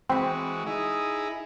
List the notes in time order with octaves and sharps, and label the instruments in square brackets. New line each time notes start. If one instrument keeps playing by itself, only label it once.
[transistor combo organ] E3 G#3 F#4 [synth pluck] C4 B5
[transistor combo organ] D#4 E4 G#4